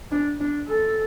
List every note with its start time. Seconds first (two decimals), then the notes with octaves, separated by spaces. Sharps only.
0.12 D4
0.40 D4
0.69 A4